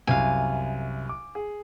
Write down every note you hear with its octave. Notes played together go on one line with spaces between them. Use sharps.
C2 F#2 F5 G#5
D6
G#4